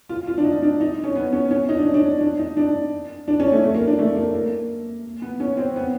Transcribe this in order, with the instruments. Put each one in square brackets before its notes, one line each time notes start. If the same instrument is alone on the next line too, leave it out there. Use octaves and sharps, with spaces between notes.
[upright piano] F4
F4
D4
D#4
D4
D#4
C#4
B3
C#4
C#4
D#4
D4
C#4
D4
D4
D#4
D4
D4
C#4
A3
A3
A#3
D4
A3
A#3
A#3
B3
C#4
C4
B3